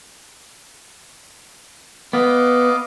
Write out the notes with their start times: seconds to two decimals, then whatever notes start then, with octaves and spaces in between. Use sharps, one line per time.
2.13 B3 D#5 F5 D6